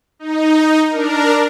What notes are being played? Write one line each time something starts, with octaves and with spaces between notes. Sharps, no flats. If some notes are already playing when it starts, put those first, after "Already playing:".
D#4
D4 A#4